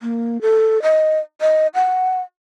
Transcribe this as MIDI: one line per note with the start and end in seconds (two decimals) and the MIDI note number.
0.01 0.41 58
0.41 0.82 69
0.82 1.18 75
1.41 1.67 75
1.75 2.21 78